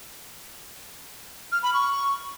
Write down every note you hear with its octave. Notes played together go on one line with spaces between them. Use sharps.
F6
B5
C#6